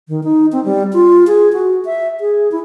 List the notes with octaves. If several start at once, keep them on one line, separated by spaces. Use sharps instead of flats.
D#3
D#4
C4
G3
F4
G#4
F#4
E5
G#4
E4